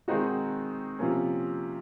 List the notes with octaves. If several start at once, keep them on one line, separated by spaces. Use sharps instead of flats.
D#3 G#3 C4 D#4 F#4
C3 F3 A#3 C#4